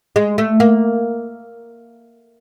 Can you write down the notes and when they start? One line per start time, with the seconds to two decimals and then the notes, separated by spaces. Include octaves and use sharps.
0.16 G#3
0.38 A3
0.60 A#3